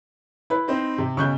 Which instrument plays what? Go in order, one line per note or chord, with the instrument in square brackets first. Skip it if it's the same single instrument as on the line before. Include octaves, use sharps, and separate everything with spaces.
[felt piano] E4 B4
[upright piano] C4 D#4 C5
C3
[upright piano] B1 C#6 [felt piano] C#3 F#6 G6